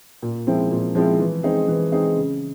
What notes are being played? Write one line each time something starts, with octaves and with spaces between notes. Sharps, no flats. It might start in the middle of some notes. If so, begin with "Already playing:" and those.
A#2
F3 G#3 C4 E4
A#2
F3 G#3 C4 E4
E3
G#3 C4 D#4 G#4
E3
G#3 C4 D#4 G#4
C#3